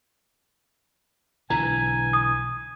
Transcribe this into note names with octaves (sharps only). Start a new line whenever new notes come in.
B1 D3 E3 G#5 A#5
D#6